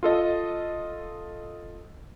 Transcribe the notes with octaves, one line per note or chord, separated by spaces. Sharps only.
F4 A4 D#5